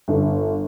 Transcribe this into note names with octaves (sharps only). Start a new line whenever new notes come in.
G1